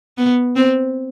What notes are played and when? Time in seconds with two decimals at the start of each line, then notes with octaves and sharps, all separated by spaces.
0.18 B3
0.56 C4